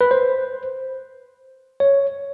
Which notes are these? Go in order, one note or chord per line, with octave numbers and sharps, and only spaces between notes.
B4
C5
C#5